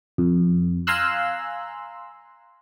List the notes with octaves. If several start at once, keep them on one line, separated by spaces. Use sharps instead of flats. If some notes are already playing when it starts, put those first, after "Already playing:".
F2
F5 G#5 A#5 C6 E6 F#6